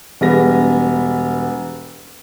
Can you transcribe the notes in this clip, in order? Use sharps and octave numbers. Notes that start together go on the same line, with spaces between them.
E1 G3 B3 A#6